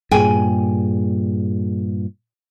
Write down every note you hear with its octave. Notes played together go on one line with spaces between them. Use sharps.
G2 A#2 G#4 G5 G#5